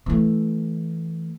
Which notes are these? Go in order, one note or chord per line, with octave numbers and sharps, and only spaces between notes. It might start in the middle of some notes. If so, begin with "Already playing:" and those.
E3 A3